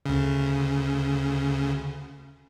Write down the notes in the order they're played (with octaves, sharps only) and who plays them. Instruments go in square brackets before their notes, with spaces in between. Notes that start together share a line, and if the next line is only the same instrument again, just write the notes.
[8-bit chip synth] D2 C#3